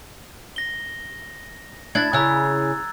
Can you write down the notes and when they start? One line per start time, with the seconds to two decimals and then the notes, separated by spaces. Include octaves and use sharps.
0.56 A#6 G7
1.95 D4 E4 G#6 A6
2.13 C#3 E4 A#5 E6 F#6